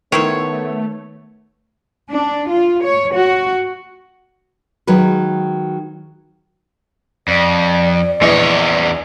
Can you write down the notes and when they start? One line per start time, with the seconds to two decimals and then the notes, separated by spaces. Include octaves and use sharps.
0.12 D#3 A3 B3 E4 C5 C#5
2.11 D4
2.49 F4
2.83 C#5
3.15 F#4
4.87 D#3 F#3 G#3 B4
7.28 F2 D5
8.21 A#1 E2 E3 C#5 D#5